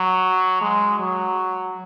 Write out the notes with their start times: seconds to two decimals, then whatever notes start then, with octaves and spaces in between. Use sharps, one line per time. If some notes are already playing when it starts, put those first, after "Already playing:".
Already playing: F#3
0.62 G#3
0.99 F#3